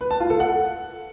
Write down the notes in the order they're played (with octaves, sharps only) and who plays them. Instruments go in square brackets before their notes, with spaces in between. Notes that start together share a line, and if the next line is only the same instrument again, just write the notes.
[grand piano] B4
A5
F4
A4
F#5